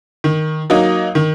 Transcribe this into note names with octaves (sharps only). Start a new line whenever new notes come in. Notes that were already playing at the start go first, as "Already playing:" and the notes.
D#3
F#3 A#3 D#4
D#3